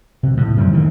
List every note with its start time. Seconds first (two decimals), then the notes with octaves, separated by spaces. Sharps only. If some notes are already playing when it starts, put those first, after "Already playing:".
0.23 C3
0.37 A2
0.57 F#2 C3 F3 G3
0.73 D#3 E3 A3 A#3